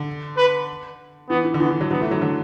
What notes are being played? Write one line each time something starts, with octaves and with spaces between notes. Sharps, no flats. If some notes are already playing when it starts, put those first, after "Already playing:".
Already playing: D3
B4
E3 B3
E3
D3
E3 B3
D3
D3 F#3
D3 F#3 B3
E3 A3
D3 F#3
D3 F#3